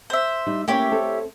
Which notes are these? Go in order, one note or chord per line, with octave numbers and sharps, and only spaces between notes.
C5 E5
G3 D#4
A#3 C#4 E4 G4 A#4 C#5
C4 A4